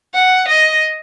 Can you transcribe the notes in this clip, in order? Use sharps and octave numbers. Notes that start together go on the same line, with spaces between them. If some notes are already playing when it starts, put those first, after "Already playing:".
F#5
D#5